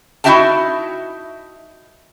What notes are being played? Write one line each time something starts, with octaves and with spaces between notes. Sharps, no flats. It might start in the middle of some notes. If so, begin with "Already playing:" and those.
D#4 E4 F#4 E5 G5 A5